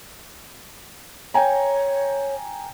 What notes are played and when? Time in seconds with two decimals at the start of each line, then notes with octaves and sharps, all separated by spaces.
1.34 C#5 G5 G#5 A#5